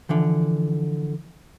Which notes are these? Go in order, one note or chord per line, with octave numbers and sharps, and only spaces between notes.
D3 E3 F3